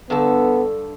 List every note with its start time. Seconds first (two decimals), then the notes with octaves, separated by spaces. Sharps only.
0.10 G2 D3 B3 A4